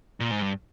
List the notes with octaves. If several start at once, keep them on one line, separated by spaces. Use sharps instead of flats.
A#2
G#2
G2